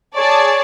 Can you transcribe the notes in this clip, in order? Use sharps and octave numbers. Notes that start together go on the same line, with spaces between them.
G#4 C#5 D5 A5